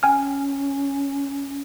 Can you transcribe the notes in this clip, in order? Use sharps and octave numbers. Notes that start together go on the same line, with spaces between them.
C#4 G5 G#5 F6